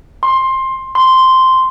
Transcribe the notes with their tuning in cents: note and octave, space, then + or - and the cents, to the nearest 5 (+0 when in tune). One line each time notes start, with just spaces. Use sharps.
C6 +15
C6 -5